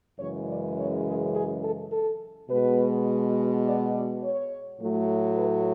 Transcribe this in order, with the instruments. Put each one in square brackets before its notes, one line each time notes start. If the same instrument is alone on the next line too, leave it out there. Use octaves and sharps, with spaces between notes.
[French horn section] F#2 C#3 E3 G#3 C#5
D5
C#5
G#4
G#4
A4
A4
B2 G#3 B4
D5
D5
C#5
A2 F#3 A3
B4